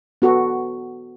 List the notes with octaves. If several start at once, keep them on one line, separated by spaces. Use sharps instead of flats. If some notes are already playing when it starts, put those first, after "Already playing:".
B3 F#4 A4